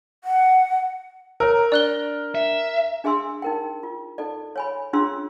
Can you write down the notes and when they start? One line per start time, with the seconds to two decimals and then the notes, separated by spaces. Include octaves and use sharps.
0.24 F#5
1.40 A#4 C#5 A#5 E6
1.72 D4 D5 F#6 G7
2.35 E5
3.04 D4 G#4 E5 G#5 C6 E6
3.42 D#4 A#4 G5
3.83 F4
4.18 D#4 A4 D5
4.56 C#5 G#5 B5
4.93 C#4 D4 F4 G#4 C6 E6